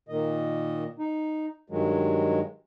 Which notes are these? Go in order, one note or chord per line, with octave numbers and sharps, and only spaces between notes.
A#2 D#3 D#5
D#4
G2 D#3 F#3 G#3